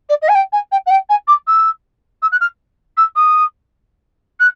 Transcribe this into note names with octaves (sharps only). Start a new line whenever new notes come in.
D5
D#5
G#5
G5
G#5
G5
F#5
G5
G#5
D6
E6
E6
F#6
F6
E6
D#6
F#6